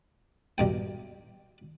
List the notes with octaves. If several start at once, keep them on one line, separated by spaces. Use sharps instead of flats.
B1 G2 G5